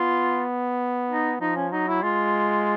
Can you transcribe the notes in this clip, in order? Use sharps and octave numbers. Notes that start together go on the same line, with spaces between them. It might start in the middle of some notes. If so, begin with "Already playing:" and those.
Already playing: B3 F4
D#4
F3 D#4
C#4
F#3 D#4
E4
G#3 F4